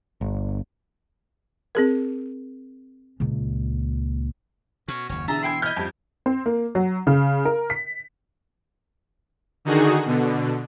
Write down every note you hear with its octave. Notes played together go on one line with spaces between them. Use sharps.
G1
C4 G#4 A#4
C#2 A#2
B2 C#4 F#4
F#1 D#2 C#4
B2 D3 E3 G#4 E5 A5 A#5
E4 G5 G#5 C6
E4 D#5 F6 G6 G#6
F2 G3
C4
A#3
F#3
C#3
A#4
B6
D3 D#3 D#4 F#4 G#4
B2 D3